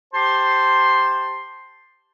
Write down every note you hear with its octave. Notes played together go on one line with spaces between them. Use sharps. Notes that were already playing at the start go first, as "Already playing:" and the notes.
G4 C5 A5 C6